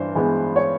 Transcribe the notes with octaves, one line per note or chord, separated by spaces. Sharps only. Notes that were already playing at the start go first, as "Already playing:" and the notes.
Already playing: G2 E3 C5
E3 G#3 B3
C#5